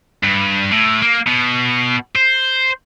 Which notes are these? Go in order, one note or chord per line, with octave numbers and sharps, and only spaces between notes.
G2
A2
A#3
B2
C5